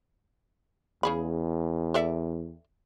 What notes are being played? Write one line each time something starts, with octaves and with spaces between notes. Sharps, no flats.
E2 C#3 G#4 B5
A4 D5 E5